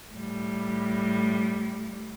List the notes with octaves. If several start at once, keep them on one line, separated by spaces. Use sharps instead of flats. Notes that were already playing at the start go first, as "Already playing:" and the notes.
A2 G3